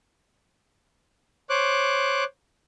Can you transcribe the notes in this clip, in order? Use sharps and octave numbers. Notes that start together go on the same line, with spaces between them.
C5 C#5 D6 F#6